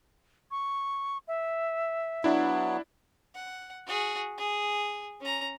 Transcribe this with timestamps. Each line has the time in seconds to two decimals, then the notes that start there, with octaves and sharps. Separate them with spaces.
0.51 C#6
1.28 E5
2.24 F#3 B3 D4 E4
3.35 F#5
3.87 F#4 G#4
4.38 G#4
5.21 C#4 A#5